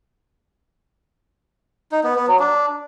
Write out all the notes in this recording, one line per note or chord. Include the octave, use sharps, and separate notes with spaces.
D#4
B3
B3
F#3
D4